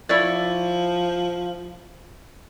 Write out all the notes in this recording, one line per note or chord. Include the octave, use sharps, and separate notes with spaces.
F3 E4 C#5 D5